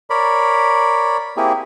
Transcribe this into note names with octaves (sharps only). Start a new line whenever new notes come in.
A#4 C#5 D5 B5
A#3 C4 E4 G4 G#4